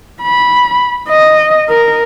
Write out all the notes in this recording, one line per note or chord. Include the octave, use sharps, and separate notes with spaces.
B5
D#5
A#4